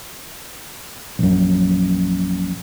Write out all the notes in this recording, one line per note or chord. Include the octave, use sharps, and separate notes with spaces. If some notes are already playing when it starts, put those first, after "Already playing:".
A#1 F#2